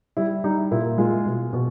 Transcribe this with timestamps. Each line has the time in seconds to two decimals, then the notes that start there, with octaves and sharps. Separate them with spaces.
0.17 G3 E4
0.44 G3 D#4
0.71 A#2 E4
0.98 G#3 F4
1.26 B2
1.53 B2